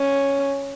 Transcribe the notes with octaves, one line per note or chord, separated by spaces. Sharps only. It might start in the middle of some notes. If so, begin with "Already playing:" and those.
Already playing: C#4